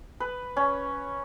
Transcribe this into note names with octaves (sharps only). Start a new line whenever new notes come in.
B4
C#4